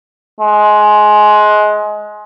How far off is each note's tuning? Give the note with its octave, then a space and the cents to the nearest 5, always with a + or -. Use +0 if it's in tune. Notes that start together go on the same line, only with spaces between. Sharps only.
G#3 +20